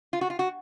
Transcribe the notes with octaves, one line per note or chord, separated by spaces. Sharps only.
F4
F#4
F4
F#4